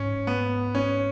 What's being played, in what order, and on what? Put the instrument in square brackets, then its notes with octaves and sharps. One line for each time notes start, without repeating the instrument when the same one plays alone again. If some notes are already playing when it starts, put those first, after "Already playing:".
Already playing: [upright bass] G#2 [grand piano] C#4
[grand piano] B3
C#4